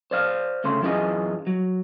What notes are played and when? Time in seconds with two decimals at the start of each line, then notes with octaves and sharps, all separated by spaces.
0.11 C5 D5 F5
0.64 D2 C#3 A3 C6
0.81 F#2 E3 F4 G#4 D#5
1.47 F#3